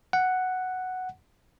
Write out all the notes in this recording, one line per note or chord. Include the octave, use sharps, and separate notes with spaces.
F#5